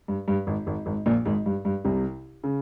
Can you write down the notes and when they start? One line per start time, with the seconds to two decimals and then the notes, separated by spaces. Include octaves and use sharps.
0.08 G2
0.28 G2
0.46 G#1 G#2
0.66 G#1 G#2
0.86 G#1 G#2
1.06 A#1 A#2
1.25 G#1 G#2
1.46 G2
1.65 G2
1.84 C2 C3
2.44 C#3